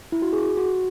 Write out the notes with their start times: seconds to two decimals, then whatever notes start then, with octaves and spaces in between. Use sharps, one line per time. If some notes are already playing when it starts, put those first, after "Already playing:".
0.12 E4
0.22 F#4
0.33 G#4
0.57 F#4